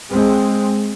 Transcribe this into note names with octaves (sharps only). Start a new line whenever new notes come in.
G#3 C4